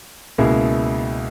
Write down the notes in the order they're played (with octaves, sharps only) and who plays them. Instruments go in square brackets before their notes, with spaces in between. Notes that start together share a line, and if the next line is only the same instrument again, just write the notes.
[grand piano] C#2 B2 A#3 E4 G#4